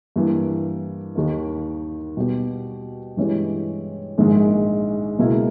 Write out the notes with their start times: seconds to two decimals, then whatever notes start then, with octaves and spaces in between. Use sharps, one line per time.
0.16 G2 E3 A#3
1.15 D#2 D#3 A#3
2.17 B2 G3 B3 G4
3.17 G2 E3 G#3 C#4 G4
4.18 A#1 G#2 D#3 G#3
5.19 C#2 B2 A#3 E4